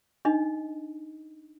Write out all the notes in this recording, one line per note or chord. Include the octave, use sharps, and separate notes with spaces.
D4 D#4 D#5